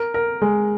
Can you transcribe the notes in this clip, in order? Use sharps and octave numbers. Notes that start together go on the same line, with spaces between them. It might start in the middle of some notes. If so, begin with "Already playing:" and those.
Already playing: A#4
A#4
G#3